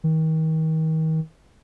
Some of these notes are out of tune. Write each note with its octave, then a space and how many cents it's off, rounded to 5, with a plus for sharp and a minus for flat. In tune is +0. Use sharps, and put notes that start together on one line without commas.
D#3 +35